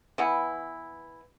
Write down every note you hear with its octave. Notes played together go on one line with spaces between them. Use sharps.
E3 B3 E4